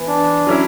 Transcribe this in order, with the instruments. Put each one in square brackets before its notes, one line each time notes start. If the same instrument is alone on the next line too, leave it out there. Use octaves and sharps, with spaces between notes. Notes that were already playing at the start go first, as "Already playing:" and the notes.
Already playing: [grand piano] E3 B3 E4
[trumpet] D4
[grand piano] F#3 C#4 E4